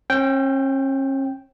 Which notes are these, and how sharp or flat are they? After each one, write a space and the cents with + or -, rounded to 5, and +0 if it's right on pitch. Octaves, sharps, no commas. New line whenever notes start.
C#4 -40 G5 -5